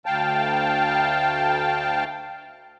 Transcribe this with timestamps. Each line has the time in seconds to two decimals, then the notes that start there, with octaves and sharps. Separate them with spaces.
0.06 D2 F5 G5 A5